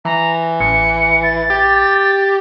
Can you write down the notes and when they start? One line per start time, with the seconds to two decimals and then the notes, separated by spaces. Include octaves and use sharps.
0.05 E3 A#5
0.60 A1 C#7
1.23 A6
1.50 G4